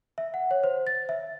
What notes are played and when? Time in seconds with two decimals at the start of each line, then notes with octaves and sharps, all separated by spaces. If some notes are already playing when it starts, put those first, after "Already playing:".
0.18 E5
0.34 F#5
0.51 C#5
0.64 C5
0.87 A6
1.09 E5